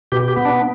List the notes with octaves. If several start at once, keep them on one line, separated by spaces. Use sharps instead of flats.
B2 G4
G4
B3
D4